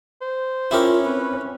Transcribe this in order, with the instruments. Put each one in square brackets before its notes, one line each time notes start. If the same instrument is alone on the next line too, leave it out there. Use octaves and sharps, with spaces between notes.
[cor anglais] C5
[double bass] C#4 [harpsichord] E4 G4 A#4 [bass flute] F4
[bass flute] C4 [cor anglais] B4